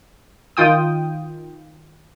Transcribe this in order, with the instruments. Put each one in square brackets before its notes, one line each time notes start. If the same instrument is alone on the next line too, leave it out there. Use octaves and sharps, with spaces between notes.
[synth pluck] D#3 F4 G5 D#6